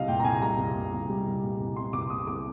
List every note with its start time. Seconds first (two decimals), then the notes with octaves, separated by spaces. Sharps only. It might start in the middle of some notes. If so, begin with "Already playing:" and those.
Already playing: C2 G3 D#5 F5
0.08 A#2 G5
0.20 A#5
0.24 C2 G#5
0.41 G3 A#5
0.58 C2
0.75 A#2
0.92 C2
1.09 G3
1.26 C2
1.43 A#2
1.60 C2
1.76 G3 C6
1.93 C2 D6
2.10 A#2 D#6
2.27 C2 D6